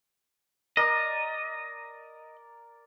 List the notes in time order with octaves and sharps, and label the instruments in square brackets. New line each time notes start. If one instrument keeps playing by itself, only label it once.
[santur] A#4 D5 A#5 [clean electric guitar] D#5